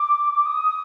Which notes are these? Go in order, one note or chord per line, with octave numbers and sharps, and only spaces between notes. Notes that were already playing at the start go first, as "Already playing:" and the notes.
Already playing: D6
D#6